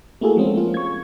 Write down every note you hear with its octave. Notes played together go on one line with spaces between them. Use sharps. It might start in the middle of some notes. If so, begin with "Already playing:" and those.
A3 A#3 E4 F#4 G#4 A4
F3 G#3 C4 C#4
A#3 F4
C#6 G#6